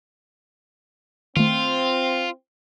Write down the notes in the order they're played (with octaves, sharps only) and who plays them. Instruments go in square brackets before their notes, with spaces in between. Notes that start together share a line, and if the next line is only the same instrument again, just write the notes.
[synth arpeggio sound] D#3 A3 [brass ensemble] C4 [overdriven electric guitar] F4